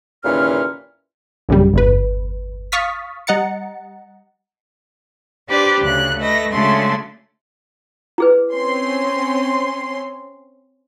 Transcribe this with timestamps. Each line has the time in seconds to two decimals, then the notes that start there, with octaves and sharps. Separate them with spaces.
0.24 D#2 A#2 C#3 E3 C#4 F6
1.49 A#1 F#2 C#3 G3
1.74 G1 E2 B4
2.72 F5 C#6 D#6 F6 A6 B6
3.27 G3 D#5 F#5 A#5 A6 C#7
5.48 D4 G4 B4 C5 D5
5.82 D2 C#3 F#6
6.18 A3 B4 D#5 A#6
6.52 C#3 G#3 A3 D4 F#4 C6
8.18 E4 G#4 B4
8.53 C4 C#4 C6